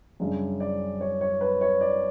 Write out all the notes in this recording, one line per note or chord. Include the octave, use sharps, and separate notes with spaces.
F#2 C#3 G3 D4
D5
C#5
C#5
B4
C#5
D5